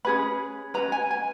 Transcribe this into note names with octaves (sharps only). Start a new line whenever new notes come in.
C#4 G#4 B4 B5
C#4 G#4 B4 A#5
G#5
G#5